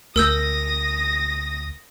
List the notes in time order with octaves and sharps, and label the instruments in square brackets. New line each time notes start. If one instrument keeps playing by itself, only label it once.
[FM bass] D2 [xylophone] A#4 E6 G6 [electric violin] D#6 A#6